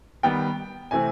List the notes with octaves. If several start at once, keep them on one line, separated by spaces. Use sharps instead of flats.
D#3 G3 B3 G5
C3 E3 A3 C4 G#5